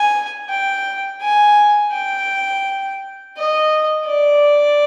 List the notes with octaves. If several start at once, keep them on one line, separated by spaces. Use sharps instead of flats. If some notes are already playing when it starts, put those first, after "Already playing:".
Already playing: G#5
G5
G#5
G5
D#5
D5